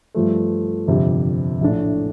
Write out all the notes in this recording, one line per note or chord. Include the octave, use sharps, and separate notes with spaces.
G2 F3 A3
G1 F2 C3
A#1 A2 A3 D4